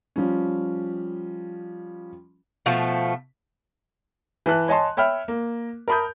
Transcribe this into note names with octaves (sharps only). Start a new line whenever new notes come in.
F3 G3 C#4
B2 F3 A3
E3 B4 A5 F#6
C#5 D#5 G#5 A5 C6
C#5 E5 G5 B5 F6
A#3
A#4 A5 B5 D#6 G6